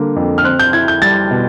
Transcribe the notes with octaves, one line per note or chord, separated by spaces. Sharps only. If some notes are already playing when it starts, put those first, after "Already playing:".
Already playing: D3 G3 A#3
F2
F6
C4 F#6
G6
E4 G#6
G6
G3 A6
B2